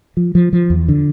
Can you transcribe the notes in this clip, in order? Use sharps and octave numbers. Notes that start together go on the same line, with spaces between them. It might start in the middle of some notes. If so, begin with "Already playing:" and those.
F3
F3
F3
E2
D3